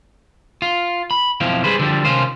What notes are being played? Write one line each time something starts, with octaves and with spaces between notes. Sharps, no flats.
F4
B5
B1 F3 C4 E4 F5
G3 G#4 B4 C5
D3 F3 G3
C3 D#3 C#4 F4 C5